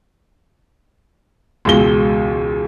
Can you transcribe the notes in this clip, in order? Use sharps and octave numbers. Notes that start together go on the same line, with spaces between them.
E1 C#2 G7